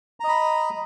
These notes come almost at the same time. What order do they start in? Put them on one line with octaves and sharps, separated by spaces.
A#5 D#5 B5